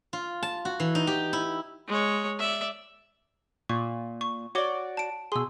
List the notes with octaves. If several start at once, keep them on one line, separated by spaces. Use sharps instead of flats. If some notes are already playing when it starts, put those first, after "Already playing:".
F4
A5
F#4
E3
D#4
G4
E4
G#3 C#5
D5 E5
A#2 C#6
C#6
F#4 C#5 D5 D6 G7
A5 D7
B2 G#4 C6 E6